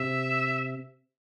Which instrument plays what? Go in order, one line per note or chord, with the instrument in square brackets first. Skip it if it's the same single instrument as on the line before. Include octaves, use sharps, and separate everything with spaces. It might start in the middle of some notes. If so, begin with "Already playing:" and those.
Already playing: [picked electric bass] C3 [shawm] E5